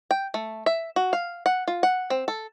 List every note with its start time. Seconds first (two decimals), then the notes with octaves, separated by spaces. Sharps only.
0.11 G5
0.34 A3
0.66 E5
0.96 F#4
1.13 F5
1.46 F#5
1.68 F4
1.83 F#5
2.10 C4
2.28 A4